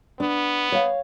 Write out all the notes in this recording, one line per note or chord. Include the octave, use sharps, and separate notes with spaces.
B3 D4
C#5 F5